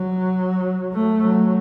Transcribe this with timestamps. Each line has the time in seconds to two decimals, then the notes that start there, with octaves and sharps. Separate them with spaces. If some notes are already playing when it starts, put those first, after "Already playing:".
Already playing: F#3
0.93 A3
1.22 F#3